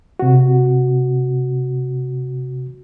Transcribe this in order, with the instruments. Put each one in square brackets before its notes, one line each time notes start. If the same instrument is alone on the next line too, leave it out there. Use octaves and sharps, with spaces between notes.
[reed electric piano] C3 F#4